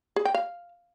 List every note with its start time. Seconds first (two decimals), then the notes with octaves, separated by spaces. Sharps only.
0.16 G#4
0.25 G5
0.34 F5